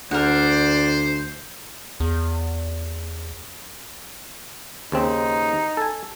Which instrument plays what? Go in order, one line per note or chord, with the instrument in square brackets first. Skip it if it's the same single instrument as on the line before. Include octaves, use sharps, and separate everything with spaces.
[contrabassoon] D2 [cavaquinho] A#4 F#5 [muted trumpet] C5 [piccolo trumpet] D5
[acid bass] E2
[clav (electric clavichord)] D#2 C#3 C4 [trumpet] D#4
[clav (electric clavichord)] A4 G#5